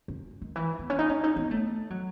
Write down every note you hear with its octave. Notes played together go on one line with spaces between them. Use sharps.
F#2
D#3
E3
B3
C#4
D#4
C#4
D#4
B3
A3
F#3